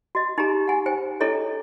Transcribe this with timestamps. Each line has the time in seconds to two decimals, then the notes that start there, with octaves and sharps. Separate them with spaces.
0.15 F#4 D#5
0.38 D#4 G4 G#4 A#5
0.68 F#5 G#5
0.86 C5 G5 G#5
1.21 D4 E4 G#4 A4 C#5 D#5